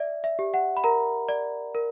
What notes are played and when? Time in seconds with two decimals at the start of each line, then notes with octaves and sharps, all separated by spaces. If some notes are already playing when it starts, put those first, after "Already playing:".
Already playing: D5 E5
0.24 E5
0.39 G4
0.54 F#5
0.77 B5
0.84 A#4 A#5
1.29 D5
1.75 A#4